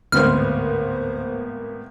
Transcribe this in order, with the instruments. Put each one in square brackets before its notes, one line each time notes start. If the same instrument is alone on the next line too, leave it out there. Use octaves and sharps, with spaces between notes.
[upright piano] G#1 A2 C3 [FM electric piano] D2 C5 [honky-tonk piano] A#3 B3 [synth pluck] F6